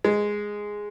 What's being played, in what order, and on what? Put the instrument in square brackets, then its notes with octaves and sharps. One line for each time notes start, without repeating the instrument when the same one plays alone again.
[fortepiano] G#3